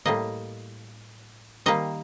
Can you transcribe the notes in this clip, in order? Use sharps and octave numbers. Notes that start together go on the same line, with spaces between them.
A2 G3 A#3 D#5
D#3 G3 A#3 D#5